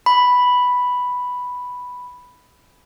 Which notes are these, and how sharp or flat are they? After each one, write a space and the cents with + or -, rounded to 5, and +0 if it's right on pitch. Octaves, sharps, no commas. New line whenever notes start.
B5 +0